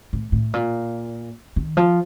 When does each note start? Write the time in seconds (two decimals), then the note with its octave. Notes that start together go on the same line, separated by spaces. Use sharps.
0.13 A2
0.32 A2
0.54 A#2
1.56 D#3
1.77 F3